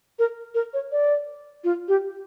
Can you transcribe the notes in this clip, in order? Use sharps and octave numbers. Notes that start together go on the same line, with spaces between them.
A#4
A#4
C#5
D5
F4
G4